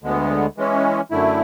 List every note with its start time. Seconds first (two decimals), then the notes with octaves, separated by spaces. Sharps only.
0.03 D2 D3 G#3 B3
0.57 E3 G#3 C#4
1.11 F#2 D3 A3 E4